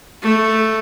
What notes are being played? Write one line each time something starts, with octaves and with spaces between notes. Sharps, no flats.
A3